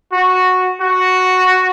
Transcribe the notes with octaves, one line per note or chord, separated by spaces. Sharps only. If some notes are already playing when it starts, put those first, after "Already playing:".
F#4
F#4